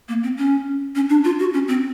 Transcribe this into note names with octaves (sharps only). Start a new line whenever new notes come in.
A#3
C4
C#4
C#4
D4
F4
F#4
C#4
C4